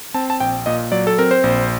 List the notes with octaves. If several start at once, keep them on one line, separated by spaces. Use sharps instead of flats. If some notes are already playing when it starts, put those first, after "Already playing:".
C4 A5
A5
A#1 G5
A#2 D#5
F#3 D5
A4
C4 A#4
C5
A#1